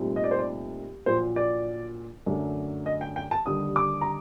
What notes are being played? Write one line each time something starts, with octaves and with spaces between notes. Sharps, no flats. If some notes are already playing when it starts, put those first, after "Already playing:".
Already playing: C2 A#2 A3 C4 D#4
D#5
D5
C5
D5
A#1 A#2 F#3 C5
D5
F#2 D3 F#3 A3 D4
D#5
G5
G5
A5
D#2 D3 G3 D4 D#6
D6
A#5